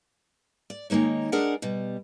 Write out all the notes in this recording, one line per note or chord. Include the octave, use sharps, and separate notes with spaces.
D5
D#3 G#3 A#3 D#4 C#5
G#3 D4 G#4 A#4 D5 F#5
B2 G3